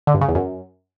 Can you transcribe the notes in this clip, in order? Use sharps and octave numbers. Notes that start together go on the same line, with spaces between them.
D3
G2
C#3
E2
F#2